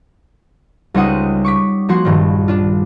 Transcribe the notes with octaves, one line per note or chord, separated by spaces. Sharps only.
C#2 G3 D#4 C5 F#5 D#6
C#6 D6 B6
F3 A#3 F#4 F#5 C6
A#1 G2 D#3
D4 F4